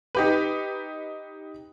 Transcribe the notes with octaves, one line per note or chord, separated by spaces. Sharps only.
D#4 G4 B4